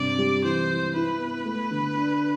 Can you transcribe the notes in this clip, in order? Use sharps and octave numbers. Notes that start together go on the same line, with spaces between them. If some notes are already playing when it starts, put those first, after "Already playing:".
Already playing: G2 C3 D5
G3
E3 C5
E3
E4 B4
B3
A3
D3
D4